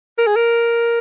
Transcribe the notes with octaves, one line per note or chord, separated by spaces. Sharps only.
A#4
G#4
A#4